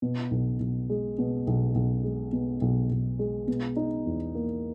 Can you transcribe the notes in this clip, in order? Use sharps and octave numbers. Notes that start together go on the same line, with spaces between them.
B2
B1
B1
G#3
B2
B1
B1
G#3
B2
B1
B1
G#3
B2
D#4
E2
A#3